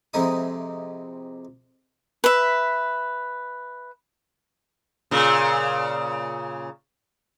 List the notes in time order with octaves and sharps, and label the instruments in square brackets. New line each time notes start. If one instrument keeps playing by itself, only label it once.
[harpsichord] F2 C3 G#3 D#4 E4 D#6
[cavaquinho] B4 E5
[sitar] A#2 C#3